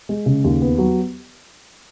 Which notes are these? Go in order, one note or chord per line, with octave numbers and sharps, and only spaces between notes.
G#3
C#3
D#2
B3
F#3